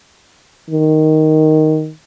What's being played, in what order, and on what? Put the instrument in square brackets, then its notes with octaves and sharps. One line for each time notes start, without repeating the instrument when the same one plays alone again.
[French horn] D#3